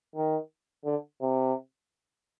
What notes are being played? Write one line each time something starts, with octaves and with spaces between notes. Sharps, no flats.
D#3
D3
C3